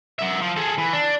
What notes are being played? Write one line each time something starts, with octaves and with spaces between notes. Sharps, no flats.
F#3 E5
F3
G#4 A4
E3
D4